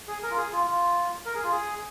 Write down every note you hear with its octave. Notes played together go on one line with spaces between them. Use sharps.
G#4
A#4
F4
G#4
F4
F4
A#4
G#4
F4
G#4